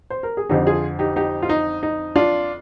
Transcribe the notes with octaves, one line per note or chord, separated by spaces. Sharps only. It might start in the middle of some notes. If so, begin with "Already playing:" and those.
C5
A#4
G#4
F2 D3 F3 D#4 G4
F4 G#4
D#4 G4
D#4 G4
F4
D#4
D#4
D4 F4